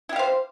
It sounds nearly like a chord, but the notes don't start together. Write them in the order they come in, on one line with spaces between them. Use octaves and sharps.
E4 G4 F5 C5